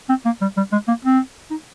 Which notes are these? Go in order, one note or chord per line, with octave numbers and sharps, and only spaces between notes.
C4
A#3
G3
G3
G#3
A#3
C4
D#4